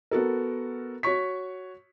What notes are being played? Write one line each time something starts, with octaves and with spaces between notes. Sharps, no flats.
B3 F#4 A4 A#4
F#4 C#5 C#6 B6